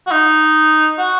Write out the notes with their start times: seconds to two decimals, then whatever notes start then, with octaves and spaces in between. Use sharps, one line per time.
0.07 F#4
0.11 D#4
0.99 F#4